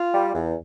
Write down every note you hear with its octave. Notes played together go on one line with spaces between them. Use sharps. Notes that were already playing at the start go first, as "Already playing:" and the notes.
Already playing: F4
G3
E2